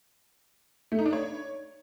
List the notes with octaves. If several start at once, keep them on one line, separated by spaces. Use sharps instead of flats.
A3
D#4
D4
C#5